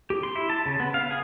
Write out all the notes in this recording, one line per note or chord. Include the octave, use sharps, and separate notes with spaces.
G4
C6
E4
A5
C#3
B3
F5
G#4